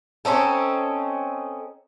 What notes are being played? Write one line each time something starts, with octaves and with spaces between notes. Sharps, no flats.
C4 C#4 D#4 A4